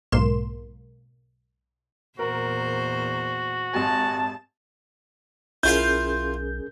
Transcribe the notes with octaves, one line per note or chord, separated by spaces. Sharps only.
B1 G#2 A#3 C6 E7
E2 A#2 F#4 A#4 C5
G#1 G4 G#5 A5
B1 C#4 E4 F4 G#4 A#4 F5 G6